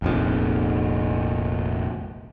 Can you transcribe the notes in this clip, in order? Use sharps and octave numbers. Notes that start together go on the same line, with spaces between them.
F1 A#1 F2